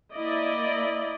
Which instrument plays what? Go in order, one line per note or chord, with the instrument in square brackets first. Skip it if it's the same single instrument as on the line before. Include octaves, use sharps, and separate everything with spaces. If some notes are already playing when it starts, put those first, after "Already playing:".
[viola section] A#3 E4 D5 D#5